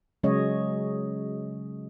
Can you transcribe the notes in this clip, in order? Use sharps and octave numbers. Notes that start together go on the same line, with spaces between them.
C#3 F#3 G#3 C#4 C#5 D#5